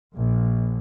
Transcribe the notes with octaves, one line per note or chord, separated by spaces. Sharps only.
A#1